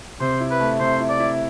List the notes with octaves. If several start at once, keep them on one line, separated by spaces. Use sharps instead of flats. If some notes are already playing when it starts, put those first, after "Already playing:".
C3 C5
E4
B4
A3
C3 C5
E4
D5
E4